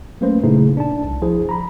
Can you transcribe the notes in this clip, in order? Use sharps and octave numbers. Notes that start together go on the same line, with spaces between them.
F#3 A3 A#3 C#4 B4 C5
A#2 C#3 A3 D#4 E4 G#4
D4 A5
C2
F3 E4 G#4 C5
A#5 B5